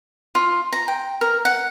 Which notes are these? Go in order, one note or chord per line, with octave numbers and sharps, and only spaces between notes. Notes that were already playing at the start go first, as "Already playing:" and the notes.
F4
A#5
G5
A#4
F#5